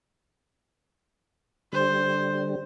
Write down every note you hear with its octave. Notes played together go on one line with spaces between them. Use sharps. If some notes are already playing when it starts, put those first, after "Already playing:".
D3 G3 C5